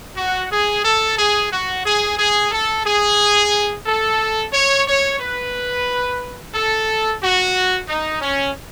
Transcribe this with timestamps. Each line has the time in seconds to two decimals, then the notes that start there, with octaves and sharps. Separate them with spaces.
0.16 F#4
0.50 G#4
0.84 A4
1.17 G#4
1.51 F#4
1.85 G#4
2.17 G#4
2.51 A4
2.85 G#4
3.86 A4
4.52 C#5
4.86 C#5
5.20 B4
6.53 A4
7.21 F#4
7.87 D#4
8.20 C#4